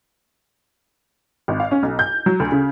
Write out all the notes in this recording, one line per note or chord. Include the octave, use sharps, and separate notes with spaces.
G#1
F5
C#4
B1
G6
F#3
D2
C#3